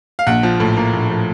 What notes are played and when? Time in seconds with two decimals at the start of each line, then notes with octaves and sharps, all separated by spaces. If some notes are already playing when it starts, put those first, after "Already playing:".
0.19 F5
0.27 A#1 F#5
0.43 F3
0.60 A2
0.77 A#3
0.93 A#1
1.10 F3